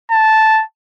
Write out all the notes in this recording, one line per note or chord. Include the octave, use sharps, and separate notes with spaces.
A5